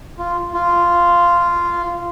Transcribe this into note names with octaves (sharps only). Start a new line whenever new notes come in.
F4
F4